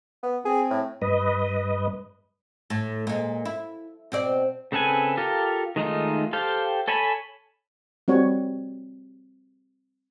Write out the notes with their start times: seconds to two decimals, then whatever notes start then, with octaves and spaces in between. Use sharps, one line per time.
0.23 B3
0.45 C4 G#4
0.70 A2
1.02 G2 B4 D#5
2.70 A2
3.07 A#2 G#3
3.45 E4
4.12 B2 C4 D5
4.72 C#3 C4 A4 B4 G#5
5.17 F4 G4 A4 A#4
5.76 D#3 G#3 A3 D#4 F4
6.33 G4 A4 C5 F5 G5
6.88 A4 C#5 G#5 A5 B5
8.08 G3 C4 F#4 C#5